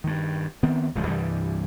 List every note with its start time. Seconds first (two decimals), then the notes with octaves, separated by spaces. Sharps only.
0.04 G2 D#3
0.63 D#3 B3 C4
0.95 D#1 C#2 C#3 F3
1.07 C2 G2 E3 G3